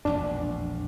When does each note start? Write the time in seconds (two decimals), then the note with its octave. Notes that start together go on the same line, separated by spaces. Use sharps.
0.05 E1 A#1 F2 D4